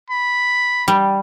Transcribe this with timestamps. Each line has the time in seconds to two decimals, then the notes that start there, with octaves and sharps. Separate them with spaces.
0.10 B5
0.88 G3